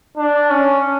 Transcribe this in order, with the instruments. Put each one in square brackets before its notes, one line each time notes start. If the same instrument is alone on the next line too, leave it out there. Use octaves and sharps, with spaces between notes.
[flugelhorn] D4
C#4